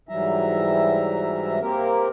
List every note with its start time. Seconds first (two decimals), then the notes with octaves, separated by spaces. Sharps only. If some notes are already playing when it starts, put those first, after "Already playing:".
0.09 G#2 E3 F#3 G3 E5 A#5
1.60 A#3 C4 G4 A#4